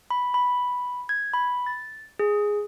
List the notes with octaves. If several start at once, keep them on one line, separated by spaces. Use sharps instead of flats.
B5
B5
G#6
B5
A6
G#4